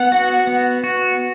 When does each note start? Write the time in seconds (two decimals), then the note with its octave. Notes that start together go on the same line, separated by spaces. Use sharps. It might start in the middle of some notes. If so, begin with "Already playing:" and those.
Already playing: B3 F#5
0.12 F#4
0.47 B3
0.84 F#4